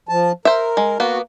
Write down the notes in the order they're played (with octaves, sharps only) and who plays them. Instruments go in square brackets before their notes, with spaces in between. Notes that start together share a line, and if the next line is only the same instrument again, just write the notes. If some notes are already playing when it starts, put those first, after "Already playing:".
[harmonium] F3 A5
[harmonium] A#4 [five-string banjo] C5 E5
[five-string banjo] G#3
[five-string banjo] A#3 B3 [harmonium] F#4